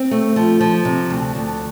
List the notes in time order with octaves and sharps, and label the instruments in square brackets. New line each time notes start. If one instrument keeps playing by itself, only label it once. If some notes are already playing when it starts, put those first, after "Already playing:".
Already playing: [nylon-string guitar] C4
A3
F3
F3
C3
D2
D2